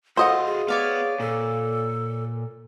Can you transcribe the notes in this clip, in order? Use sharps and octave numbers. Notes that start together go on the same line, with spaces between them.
F#4 A4 C5 D#5 F5 F#5
G#4
B3 C#5 D5 F5
A#2 A4